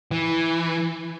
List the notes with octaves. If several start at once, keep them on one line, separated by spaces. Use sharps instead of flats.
E3